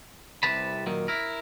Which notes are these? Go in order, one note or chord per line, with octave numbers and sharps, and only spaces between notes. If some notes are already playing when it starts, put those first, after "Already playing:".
C2 C3 B4 A5 B5
A#2 D#3 F#3 A#3
E4 A#4